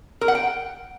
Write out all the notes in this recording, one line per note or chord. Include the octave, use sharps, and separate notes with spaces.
A#4
F#5
G5